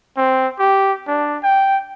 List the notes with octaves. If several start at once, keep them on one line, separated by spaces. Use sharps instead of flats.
C4
G4
D4
G5